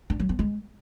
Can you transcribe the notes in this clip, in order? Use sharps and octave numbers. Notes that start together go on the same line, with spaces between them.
D4
F#3
B3
G#3